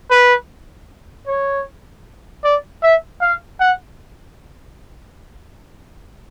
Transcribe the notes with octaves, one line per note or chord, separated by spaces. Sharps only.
B4
C#5
D5
E5
F5
F#5